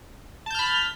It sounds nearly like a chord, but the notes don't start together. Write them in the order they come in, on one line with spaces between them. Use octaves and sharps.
A5 G6 F6 B5